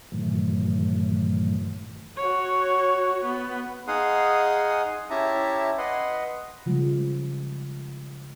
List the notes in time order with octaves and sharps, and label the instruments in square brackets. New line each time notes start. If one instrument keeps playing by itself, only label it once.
[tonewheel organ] G2 A#2 D#3 E3 F#3 A3
[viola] F#4 C#5
B3
[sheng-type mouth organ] D#4 G#4 F5 F#5 C6 D#6
C#4 E4 G4 E5 A5 A#5
B4 D#5 F#5 C6
[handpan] C#3 F3 G3 G#3